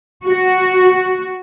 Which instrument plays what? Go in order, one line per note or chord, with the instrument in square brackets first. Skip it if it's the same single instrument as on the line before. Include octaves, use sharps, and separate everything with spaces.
[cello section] F#4